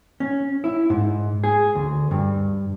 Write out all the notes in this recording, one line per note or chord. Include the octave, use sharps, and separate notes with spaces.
C#4
E4
G#2
G#4
D2
G2